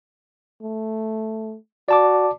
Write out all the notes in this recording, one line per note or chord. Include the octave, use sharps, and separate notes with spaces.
A3
F#4 D5 A5 D6